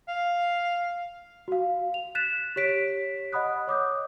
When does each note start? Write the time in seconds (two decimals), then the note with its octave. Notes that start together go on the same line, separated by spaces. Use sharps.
0.09 F5
1.48 F#4 F5
1.94 F7
2.15 F#6 A6 B6 E7
2.56 G4 C#5 B6 D7
3.32 D#5 F#5 B5 D#6 F#6
3.67 C#5 D6 D#6 G6